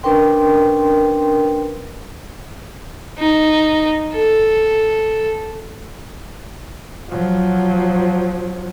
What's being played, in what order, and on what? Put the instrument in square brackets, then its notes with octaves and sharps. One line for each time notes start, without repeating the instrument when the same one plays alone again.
[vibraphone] C#4 D4 A#4 B4 G5 C6
[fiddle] D#4
A4
[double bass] F3 F#3